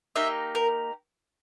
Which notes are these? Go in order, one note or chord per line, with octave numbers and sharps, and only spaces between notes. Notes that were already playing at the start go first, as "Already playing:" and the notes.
A#3 D#4 G4 E5
A#4